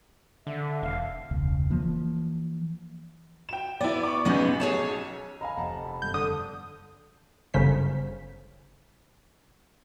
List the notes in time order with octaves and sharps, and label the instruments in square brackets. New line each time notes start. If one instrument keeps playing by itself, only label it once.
[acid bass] D3 [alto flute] E5
[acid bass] E1 [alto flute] F5
[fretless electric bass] E1 C#2
E3 F3 A#3
[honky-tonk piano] G5 E7
[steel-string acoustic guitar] B3 [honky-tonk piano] E4 D5
[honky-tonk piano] C#6 D6
[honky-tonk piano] B1 G6 [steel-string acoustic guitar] G#3 B3 C#4
[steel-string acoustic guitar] G#4 C#5 A5
[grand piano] D#5 F5 G#5 [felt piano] A#5 B5
[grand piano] F1 F#5 A5
[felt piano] B5
[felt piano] G1 [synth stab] G6
[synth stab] D3 D#6
[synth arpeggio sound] G1 F#2 C#3 C5 B6